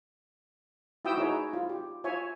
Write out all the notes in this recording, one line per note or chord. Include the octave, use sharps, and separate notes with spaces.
E4 F#4 G5 D#6 E6
D#4 E4 F#4 G#4 C#5
F4
G4
F4 C#5 E5 G#5